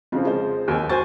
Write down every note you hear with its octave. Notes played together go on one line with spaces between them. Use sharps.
F2 C#3 F3 F4
G#3 C5
D#2 G#5
F#4 C5 G#5 A6